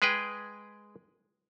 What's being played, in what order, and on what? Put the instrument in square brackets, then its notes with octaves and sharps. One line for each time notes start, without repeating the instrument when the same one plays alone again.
[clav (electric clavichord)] G#3 G#4 B4 G5